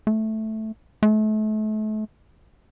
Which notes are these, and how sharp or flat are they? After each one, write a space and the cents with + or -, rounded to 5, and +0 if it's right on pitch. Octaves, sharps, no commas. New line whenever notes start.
A3 -5
A3 -35